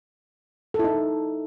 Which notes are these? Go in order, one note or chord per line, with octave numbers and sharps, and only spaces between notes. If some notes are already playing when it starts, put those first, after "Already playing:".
D#4 E4 A4